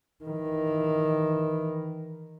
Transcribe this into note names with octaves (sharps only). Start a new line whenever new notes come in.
D#3 E3